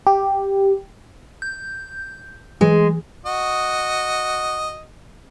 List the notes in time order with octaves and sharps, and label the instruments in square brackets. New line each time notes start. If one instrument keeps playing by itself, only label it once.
[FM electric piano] G4
[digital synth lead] G6
[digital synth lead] E3 [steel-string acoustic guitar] G#3
[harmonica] F#4 D#5